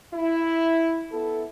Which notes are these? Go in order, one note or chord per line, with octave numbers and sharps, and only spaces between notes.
E4
B3 E4 A4